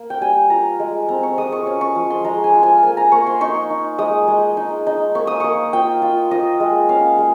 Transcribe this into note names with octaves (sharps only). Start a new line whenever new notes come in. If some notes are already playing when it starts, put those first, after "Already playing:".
Already playing: A#3
G5
G3 G#5
F4 A#5
G#3
C4 A#5
C#6
G#3 D#6
C#6
C#4 C#6
C#6
F3 D#6
C6
G#3 A#5
G#5
F4
G#5
A#3 G#5
A#5
A#3 C#6
C6
D#4 C#6
D#4
G#3 D#6
G#3
D#4
D#4
A#3 C#6
D#6
A#3 C#6
F4 G5
F4
F4 D#5
G#3
C#4 F5
G#3